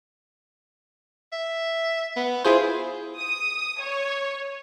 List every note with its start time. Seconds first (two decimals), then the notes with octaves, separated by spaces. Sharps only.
1.32 E5
2.17 B3
2.44 E4 F4 G#4 C5
3.17 D#6
3.80 C#5